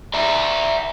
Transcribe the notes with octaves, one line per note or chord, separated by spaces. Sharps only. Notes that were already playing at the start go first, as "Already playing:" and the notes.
D5 E5 A#5